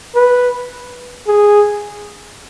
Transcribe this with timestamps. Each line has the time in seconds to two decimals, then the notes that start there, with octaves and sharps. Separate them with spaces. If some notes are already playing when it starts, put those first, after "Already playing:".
0.15 B4
1.27 G#4